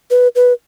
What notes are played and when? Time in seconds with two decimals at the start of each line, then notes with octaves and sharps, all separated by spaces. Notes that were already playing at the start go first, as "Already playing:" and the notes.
0.10 B4
0.35 B4